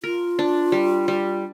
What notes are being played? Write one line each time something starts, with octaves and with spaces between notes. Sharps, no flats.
F4 A#4
D4
G3
G3